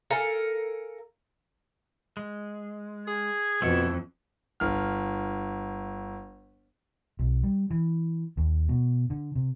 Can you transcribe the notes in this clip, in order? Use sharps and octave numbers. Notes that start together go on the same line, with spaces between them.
A4 A#4 F5 G#5
G#3
G#4 G#6
F2 B2 A3 E4 A4
G1 F6
B1
G3
E3
D#2
B2
D3
C3